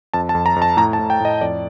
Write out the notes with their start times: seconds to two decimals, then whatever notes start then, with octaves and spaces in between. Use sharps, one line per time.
0.14 F2 A5
0.29 A5
0.35 F2
0.46 A#5
0.56 F2
0.62 A5
0.77 A2 A#5
0.93 A5
0.99 A2
1.10 G5
1.20 A2 D#5
1.41 F2 D5